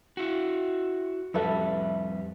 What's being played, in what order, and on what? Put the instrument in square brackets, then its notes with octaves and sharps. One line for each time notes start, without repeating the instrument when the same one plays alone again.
[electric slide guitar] E4 F#4
[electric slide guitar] F2 G3 [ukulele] A4 B4 E5